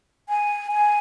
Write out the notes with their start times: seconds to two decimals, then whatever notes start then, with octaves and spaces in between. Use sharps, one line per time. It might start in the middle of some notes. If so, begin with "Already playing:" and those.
0.29 G#5
0.72 G#5